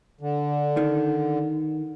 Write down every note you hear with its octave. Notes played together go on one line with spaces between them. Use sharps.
D3
D#3